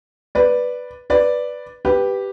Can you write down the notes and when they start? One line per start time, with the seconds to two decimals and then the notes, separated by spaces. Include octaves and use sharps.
0.35 B4 D5
1.10 B4 D5
1.85 G4 B4